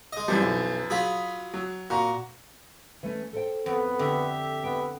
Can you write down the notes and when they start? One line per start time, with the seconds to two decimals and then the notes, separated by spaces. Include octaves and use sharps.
0.13 G#3 D#5
0.28 F#2 E3 F3 G3
0.42 B1
0.90 F#3 F4 G#4 B5
1.54 F#3
1.90 A#2 F#4 A#5 C#6
3.03 E3 A3 C#4
3.33 A4 C5 G5
3.66 F2 B3
3.99 D3 G4 E5
4.64 B3 G5